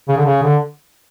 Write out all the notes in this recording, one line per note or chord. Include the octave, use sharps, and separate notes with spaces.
C#3
D3
C#3
D3